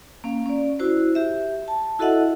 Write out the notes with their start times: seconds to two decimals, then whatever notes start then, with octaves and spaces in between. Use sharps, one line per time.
0.24 A#3 C#4 F5
0.46 C#4 D5
0.79 E4 F#4 C5
1.15 G4 E5
1.68 A5
1.99 E4 F#4 A4 D#5 E5 F#5